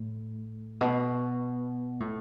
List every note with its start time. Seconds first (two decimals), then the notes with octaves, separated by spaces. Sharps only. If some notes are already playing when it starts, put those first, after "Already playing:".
Already playing: A2
0.81 B2
2.00 A2